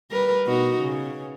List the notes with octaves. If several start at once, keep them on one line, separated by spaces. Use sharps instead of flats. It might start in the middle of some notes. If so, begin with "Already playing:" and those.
G3 A#4 B4
B2 D#4 F#4
C#3